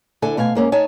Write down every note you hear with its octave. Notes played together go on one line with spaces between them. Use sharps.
D2 D3 E4 A4 G#5
B2 A3 F5 G#5
G#2 A#3 C#4
D#4 C#5 G#5 A5